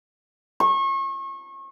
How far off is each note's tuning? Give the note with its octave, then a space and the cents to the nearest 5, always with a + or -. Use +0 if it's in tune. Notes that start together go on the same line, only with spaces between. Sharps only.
C#6 -35